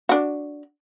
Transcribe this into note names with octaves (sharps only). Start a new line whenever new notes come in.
D4 F#4